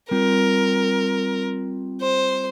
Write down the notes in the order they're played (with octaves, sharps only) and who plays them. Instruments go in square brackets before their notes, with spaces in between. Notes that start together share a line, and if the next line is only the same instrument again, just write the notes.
[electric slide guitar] G3 C4 F4 [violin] A#4
[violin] C5